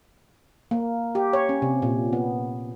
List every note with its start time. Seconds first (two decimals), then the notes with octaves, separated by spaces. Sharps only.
0.71 A#3
1.15 G4
1.33 C#5
1.49 C#4
1.62 C3
1.82 A#2
2.13 B3